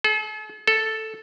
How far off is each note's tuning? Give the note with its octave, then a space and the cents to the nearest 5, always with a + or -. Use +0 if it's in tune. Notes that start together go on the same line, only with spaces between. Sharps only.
A4 -45
A4 +0